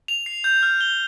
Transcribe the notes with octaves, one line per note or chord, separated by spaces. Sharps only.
F7
C7
G6
F6
G7